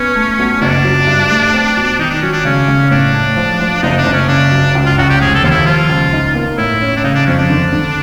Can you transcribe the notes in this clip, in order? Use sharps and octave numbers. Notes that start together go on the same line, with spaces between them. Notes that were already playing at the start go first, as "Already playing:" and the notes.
Already playing: B3 C#4
A3
B1
C#4
F#1 D4
F#3
G2
A3
C4
B2
D#3 D#4
D4
F#3 C#4
D4
C#3 C#4
C#3
A2 D4
A3
F3
F3
F#1 D#4
D4
F#1
C#4
C#3 D4
F#2
C#2
F4
C#2 F#4
G4
F1 G#4
A4
D#2 F4
E4
F3 F4
C#2
D#4
A#3
A2 E4
C#4
D4
C#3 D#4
D4
F2 C#4
D4
D3
D3